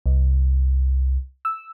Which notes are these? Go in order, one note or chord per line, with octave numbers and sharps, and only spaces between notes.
C2
E6